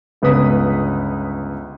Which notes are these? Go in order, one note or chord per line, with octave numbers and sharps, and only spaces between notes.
G1 C#2 B3 B4 D#6 B6